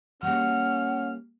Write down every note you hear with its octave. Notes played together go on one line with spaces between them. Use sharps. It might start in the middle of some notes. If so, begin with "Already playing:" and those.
G3 A#3 C#4 F#5 F6